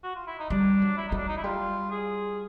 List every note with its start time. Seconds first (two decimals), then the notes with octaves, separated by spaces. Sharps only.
0.03 F#4
0.15 F4
0.27 E4
0.39 D#4
0.50 G3 D4
0.82 F#3
0.97 E4
1.08 F#3 D#4
1.17 D4
1.28 D#4
1.37 E4
1.44 G3 F4
1.91 G#4